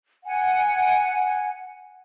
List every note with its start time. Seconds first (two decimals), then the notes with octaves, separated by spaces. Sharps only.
0.25 F#5 G#5